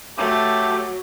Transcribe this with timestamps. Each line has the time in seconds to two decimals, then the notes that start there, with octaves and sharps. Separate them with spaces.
0.17 F#3 A3 G4